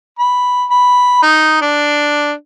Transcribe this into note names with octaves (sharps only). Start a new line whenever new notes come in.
B5
B5
D#4
D4